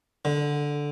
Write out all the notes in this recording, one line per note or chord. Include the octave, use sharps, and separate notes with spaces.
D3